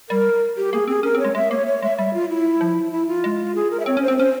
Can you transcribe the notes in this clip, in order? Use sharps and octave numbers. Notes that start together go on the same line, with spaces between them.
G3 A#4
G4
A#3 G#4
C4 G#4
C#4 A#4
C4
C#5
G#3
G#3 E5
A#3 C#5
C#5
G#3 E5
G3 E5
F4
E4
F3
E4
F4
G#3
G#4
A#4
E5
C4 C#5
C#4
C5
C4
C#4 C5